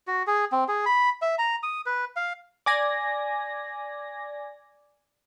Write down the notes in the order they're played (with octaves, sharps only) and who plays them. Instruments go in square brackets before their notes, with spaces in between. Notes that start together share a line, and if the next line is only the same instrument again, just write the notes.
[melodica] F#4
G#4
C4
G#4
B5
E5
A#5
D#6
B4
F5
[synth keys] D5 G#5 A#6